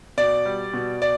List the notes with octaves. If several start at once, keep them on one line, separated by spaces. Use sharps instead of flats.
B2 D5
G3
B2
D5